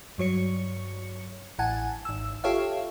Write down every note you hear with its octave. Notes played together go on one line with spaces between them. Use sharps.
G2 F#3 C#5 C#7
A1 F#5 G#5 A5
G#1 E6
F4 G4 A4 C#5 E5 F5